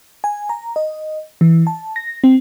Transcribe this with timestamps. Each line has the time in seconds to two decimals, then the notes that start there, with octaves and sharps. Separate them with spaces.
0.24 G#5
0.49 A#5
0.76 D#5
1.41 E3
1.67 A5
1.96 A#6
2.24 C4